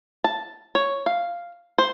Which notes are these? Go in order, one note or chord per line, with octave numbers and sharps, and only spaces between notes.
A5
C#5
F5
C5